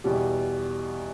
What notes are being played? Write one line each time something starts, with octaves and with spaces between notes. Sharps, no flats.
E2 B2 G3